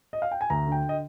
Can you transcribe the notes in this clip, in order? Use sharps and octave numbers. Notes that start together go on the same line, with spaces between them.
D#5
F5
G5
G#5
D2 A#5
D3
G5
D#5